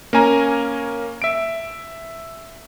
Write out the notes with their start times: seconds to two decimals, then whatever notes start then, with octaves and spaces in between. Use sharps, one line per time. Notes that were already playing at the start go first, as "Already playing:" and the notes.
0.13 A#3 C#4 G#5 A#5
1.22 E5 D7